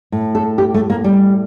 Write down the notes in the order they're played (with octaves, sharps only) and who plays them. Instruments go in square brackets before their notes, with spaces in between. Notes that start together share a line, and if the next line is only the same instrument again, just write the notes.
[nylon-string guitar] A2
A4
G4
A3
A#3
G3